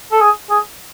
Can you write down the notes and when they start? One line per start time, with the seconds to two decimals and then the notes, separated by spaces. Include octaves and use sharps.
0.12 A4
0.21 G#4
0.50 G#4